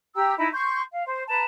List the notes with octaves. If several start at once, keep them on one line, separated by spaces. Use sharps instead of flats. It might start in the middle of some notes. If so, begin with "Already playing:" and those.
G4 G5 A#5 E6
D#4 E4 B5
C6 C#6 G6
F5
C5
B4 A5 A#5